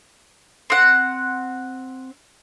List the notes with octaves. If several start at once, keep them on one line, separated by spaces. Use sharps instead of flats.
C4 F#5